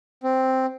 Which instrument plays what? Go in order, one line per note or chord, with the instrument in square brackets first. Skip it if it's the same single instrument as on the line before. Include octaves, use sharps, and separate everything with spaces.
[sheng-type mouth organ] C4